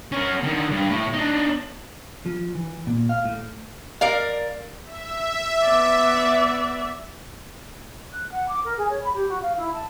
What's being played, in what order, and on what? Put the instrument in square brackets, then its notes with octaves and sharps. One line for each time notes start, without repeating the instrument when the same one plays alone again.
[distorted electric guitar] C#4 A#4
D3 D#3
G2
A2
D4 D#4
[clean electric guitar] F3
E3
A#2
F5
A2
[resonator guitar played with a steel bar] A#4 D5 F5
[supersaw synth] E5
[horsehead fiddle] B3 D5
[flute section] F#6
F#5
D6
A#4
G#4
C#5
B5
G4
F#4
F5
E4
A5